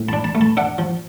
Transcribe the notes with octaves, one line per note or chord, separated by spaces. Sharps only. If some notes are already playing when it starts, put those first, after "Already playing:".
Already playing: A2
D4 A5 B5
A5 B5
A3
A5 B5
D4 E5 F#5
F3